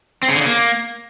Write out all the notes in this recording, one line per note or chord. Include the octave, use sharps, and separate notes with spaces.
C4
C#3
D3
C#3
A#3